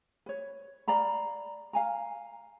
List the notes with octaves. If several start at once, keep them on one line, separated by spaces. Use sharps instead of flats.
B4 C#5
D5 F5 A#5 B5
F5 G#5 A#5